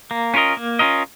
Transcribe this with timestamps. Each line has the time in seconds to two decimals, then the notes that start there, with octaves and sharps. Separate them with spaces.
0.11 A#3
0.34 C#4 F4 A#4 D#5
0.57 A#3
0.79 C#4 F4 A#4 D#5